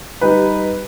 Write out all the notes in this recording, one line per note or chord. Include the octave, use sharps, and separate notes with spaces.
G3 D#4 B4